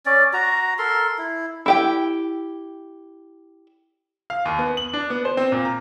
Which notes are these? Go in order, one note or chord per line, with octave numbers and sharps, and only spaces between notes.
C#4 D5
F#4 A#5
A4 A#4 C6
E4
E4 G4 G5
F5
D#2
B3
F#7
D4
B3
C5
C4
A#2
A#5